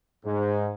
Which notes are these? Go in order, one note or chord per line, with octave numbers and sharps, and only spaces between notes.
G#2